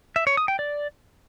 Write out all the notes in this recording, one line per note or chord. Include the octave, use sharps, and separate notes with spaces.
E5
C#5
D#6
G5
D5